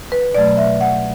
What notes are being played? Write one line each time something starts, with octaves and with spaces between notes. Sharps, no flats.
B4
B2 F#3 A3 D5
E5
F#5